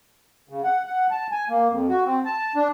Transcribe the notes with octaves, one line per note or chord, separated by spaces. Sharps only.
C#3
F#5
F#5
A5
G#5
A#3
F2
F#4
C4
A5
D4